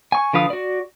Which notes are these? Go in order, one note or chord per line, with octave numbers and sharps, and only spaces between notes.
G#5 C#6
D3 F3 B4 F5 D#6
F#4 D5